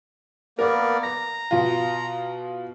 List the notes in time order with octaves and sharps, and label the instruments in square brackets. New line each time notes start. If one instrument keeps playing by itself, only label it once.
[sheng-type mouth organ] A#3 B3 D5 [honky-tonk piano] A#4
[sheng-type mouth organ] A#5 [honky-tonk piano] A#6
[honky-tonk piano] B2 F4